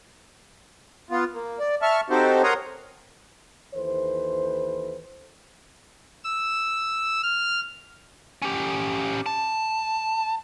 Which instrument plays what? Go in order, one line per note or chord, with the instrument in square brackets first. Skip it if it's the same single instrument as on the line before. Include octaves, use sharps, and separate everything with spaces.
[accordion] B3 F4
A#3
D5
E5 A5 C#6 F6
C4 D#4 F#4 G4 A4 C5
A#4 C#5 F#5 A#5 C6 D#6
[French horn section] D#2 E3 A4 B4 C5
[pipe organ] E6
F6
[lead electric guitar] C#4 G4
A5